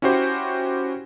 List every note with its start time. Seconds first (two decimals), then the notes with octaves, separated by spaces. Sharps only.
0.02 C#4 E4 F#4 G4 C5